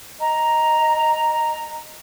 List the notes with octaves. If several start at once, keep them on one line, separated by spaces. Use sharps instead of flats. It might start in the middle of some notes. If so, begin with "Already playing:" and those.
D#5 A#5